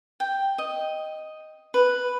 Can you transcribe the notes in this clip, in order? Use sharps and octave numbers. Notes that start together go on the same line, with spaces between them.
G5
D#5
B4